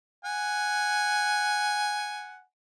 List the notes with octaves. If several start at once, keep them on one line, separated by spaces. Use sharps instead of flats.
F#5 G#5